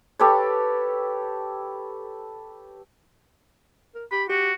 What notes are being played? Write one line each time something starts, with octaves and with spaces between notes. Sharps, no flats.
G4 A4 B4 C#5
A#4
G4 B5
F#4 G4